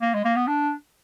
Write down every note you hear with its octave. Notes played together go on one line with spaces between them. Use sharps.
A#3
G#3
A#3
B3
D4